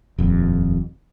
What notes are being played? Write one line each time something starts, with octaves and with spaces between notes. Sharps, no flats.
D#1 F2